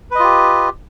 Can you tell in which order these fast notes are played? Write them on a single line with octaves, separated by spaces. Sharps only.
B4 D#5 F4 G4